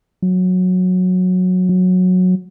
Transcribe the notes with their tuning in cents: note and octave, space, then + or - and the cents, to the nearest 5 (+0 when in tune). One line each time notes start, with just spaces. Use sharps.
F#3 -15
F#3 -15